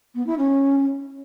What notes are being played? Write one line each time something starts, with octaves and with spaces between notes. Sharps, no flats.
B3
E4
C#4